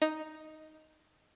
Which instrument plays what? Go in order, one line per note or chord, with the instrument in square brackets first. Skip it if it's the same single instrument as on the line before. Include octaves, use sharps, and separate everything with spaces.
[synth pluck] D#4